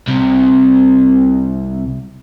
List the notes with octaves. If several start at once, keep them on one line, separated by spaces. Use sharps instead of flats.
C2 C3